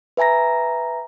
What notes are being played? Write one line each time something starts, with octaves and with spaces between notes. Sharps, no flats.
B4 E5 G#5 A#5 A#6